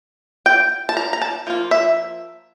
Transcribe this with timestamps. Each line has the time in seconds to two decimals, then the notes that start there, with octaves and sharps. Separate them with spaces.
0.46 G5
0.89 A5
0.97 A#5
1.13 A#5
1.22 A5
1.47 F3 A#3 F4
1.71 E5